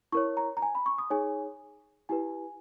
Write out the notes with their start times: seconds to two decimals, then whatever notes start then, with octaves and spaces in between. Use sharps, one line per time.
0.12 E4 A#4 C#5 C#6
0.37 A#5
0.57 A#5
0.62 G#5
0.75 B5
0.86 C#6
0.98 D#6
1.10 D#4 G#4 C#5 G#5
2.09 E4 G4 B4 G#5